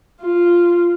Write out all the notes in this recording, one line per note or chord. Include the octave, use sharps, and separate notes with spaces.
F4